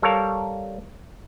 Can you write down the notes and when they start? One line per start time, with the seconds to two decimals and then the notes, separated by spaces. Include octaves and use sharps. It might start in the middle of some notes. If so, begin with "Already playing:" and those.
0.02 G3 A4 A#4 C#5 F5